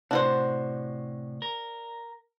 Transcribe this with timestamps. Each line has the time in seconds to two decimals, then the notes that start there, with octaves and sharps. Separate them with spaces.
0.11 A2 C3 D4 F#4 C5
1.42 A#4